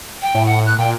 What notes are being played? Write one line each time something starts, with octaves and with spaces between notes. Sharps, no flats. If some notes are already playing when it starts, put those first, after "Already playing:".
G5
A2
F#5
F#6
A#2 G5